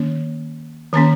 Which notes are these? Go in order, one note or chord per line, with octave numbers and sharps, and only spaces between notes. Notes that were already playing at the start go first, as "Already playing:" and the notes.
Already playing: D#3 A#3 C#4
D#3 A#3 C#4 A#5